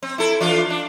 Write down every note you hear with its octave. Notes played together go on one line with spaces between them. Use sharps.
C4
E4 A4
E3 D4 F4
D4